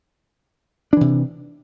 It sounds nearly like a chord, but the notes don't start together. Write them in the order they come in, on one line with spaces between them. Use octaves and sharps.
D4 E3 C3